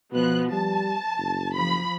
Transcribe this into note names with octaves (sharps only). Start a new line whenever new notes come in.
B2 F3 B3 F#6
G3 A5
F#1
F3 B5